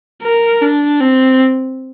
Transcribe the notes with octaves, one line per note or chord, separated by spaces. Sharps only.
A#4
D4
C4